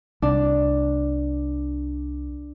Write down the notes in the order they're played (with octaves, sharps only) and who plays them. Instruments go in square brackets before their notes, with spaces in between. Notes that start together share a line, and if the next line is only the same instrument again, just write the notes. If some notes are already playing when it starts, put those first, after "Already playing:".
[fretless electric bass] C2 [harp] D4